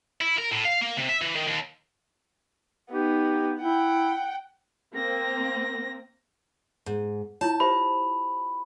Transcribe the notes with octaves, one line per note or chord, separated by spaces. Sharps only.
E4
A#4
A2
F5
A#3
C3
E5
E3
D#3
D#2
B3 D#4 G4
E4 F#5 G5
A#3 C4 A#6
G#2
E4 F4 C#5 A5
G4 C5 E5 B5